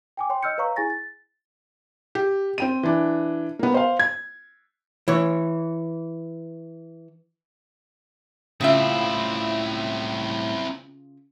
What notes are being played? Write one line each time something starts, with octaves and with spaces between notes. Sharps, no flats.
G5 G#5 D6
C#5 G5 C6
D#5 E6 F6 G6 C#7
B4 C#5 F5 A#5 C#6
E4 G#4 G#5 A6 A#6
A6
G4
C4 G5 D#7
E3 D4
A#3 B3
C5 F5
G#6
E3 C#5
A2 C#3 C4 E4 F4 E5